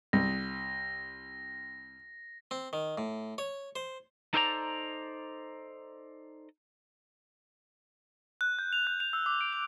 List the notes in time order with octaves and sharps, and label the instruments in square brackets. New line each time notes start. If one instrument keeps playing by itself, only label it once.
[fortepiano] C2 [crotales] A#6
[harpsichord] C4
D#3
A2
C#5
C5
[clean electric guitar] D#4 A4 C5 D5 G5 A#5
[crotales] F#6
G6
F7
F#6
F7
E6
D6
D7
F7